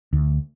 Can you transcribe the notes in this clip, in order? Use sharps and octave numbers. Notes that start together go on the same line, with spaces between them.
D2